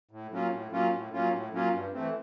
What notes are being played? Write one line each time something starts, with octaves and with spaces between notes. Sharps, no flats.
A2
F#3 A#3 C#4 F4
A2
F#3 A#3 C#4 F4
A2
F#3 A#3 C#4 F4
A2
F#3 A#3 C#4 F4
G2
E3 A3 C4